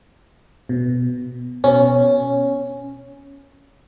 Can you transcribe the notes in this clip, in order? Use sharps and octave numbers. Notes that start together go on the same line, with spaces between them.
B2
B2 C#4